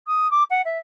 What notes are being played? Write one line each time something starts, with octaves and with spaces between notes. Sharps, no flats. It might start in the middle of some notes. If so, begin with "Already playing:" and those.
D#6
D6
F#5
E5